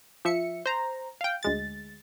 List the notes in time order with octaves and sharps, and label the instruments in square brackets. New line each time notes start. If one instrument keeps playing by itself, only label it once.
[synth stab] F3 E5 C#7
C5 A#5
F5 G5
D2 G#3 A6